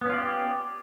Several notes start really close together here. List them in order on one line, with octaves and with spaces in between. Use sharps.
B3 C#4 F4 D5 G4